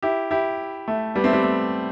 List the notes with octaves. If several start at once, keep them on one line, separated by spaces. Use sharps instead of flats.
E4 G4
E4 G4
A3
G3 B3
A3 C4
G3 B3
A3